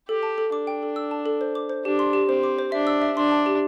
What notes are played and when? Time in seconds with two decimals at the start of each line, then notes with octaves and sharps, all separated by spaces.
0.09 G4 A4
0.23 A5
0.38 A4
0.52 D4 D6
0.67 G5
0.83 A4
0.96 E6
1.11 A5
1.26 A4
1.41 C5
1.55 D6
1.70 C5
1.85 D4 G4
1.99 C6
2.13 G4
2.29 C4 C5
2.43 D6
2.59 C5
2.72 D4 E5
2.87 E6
3.02 E5
3.17 D4 C6
3.32 A5
3.46 G4